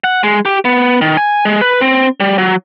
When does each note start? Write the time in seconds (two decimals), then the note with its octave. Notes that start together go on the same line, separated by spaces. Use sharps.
0.04 F#5
0.23 G#3
0.45 G4
0.65 B3
1.01 D#3
1.17 G#5
1.45 G#3
1.61 B4
1.81 C4
2.20 G3
2.38 F#3